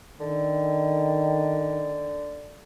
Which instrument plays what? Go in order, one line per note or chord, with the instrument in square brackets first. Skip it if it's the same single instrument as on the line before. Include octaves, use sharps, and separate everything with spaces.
[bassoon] D3 [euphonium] D#3